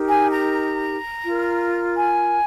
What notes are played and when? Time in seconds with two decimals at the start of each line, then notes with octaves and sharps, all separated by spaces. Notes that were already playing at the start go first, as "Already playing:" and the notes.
Already playing: D#4 G4 A#4
0.08 G#5
0.31 A#5
1.25 F4 A#4
1.95 G#5